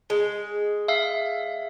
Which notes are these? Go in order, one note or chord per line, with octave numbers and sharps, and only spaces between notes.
G#3
E5 F5